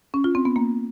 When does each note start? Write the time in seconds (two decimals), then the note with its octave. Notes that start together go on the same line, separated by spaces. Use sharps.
0.14 C#4
0.24 F4
0.35 C4
0.45 B3
0.56 A#3